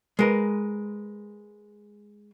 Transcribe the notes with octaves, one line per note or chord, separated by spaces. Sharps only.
G#3 A#4 B4